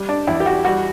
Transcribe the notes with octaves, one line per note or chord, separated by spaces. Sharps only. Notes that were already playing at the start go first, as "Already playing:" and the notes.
Already playing: G3
D4
E2 E4
G4
F#4
G3 F#4